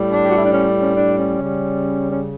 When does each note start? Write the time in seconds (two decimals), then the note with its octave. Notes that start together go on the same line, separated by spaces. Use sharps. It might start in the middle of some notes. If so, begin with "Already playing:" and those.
Already playing: A2 G3
0.10 D4
0.23 G4
0.31 F#4
0.38 E4
0.46 D4
0.54 C#4
0.82 C#4
0.97 D4
1.18 C#4
1.39 C#3 G3
2.12 C#4